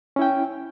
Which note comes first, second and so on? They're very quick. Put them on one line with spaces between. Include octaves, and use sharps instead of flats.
C#4 E4 G5